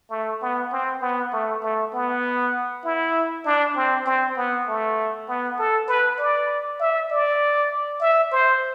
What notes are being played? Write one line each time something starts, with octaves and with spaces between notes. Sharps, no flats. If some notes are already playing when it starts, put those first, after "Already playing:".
A3
B3
C4
B3
A3
A3
B3
E4
D4
C4
C4
B3
A3
B3
A4
B4
D5
E5
D5
E5
C5